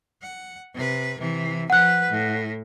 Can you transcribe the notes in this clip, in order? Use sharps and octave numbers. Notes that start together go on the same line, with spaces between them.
F#5
C3 B4
C3 E3
F3 B4 F#5 F#6
A2